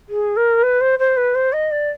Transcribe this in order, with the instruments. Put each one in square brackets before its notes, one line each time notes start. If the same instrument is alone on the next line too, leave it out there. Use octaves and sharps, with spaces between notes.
[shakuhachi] G#4
A#4
B4
C5
C5
B4
C5
D#5
D5